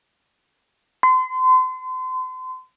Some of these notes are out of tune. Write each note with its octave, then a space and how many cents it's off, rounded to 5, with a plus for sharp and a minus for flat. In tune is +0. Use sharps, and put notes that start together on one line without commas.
C6 -35